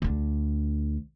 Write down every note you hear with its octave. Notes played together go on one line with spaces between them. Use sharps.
D2 D4